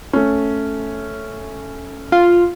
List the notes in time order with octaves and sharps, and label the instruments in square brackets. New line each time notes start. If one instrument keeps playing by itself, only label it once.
[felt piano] A3 C#4
[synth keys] F4